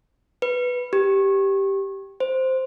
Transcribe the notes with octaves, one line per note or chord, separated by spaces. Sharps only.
B4
G4
C5